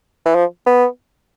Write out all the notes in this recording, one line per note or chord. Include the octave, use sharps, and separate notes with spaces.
E3
F3
B3